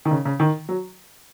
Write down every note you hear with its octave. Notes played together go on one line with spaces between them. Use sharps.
D#3
C#3
C#3
D#3
F#3